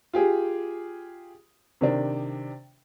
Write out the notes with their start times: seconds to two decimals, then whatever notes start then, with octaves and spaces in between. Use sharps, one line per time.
0.13 F4 G4 G#4
1.81 C3 D#3 D4